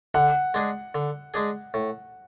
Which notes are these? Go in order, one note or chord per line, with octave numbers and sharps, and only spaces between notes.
D3 F#5
G#3 D4 G#4
D3
G#3 D4 G#4
A2